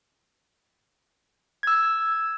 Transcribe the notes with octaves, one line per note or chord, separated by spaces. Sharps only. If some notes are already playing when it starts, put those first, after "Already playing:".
E6 G#6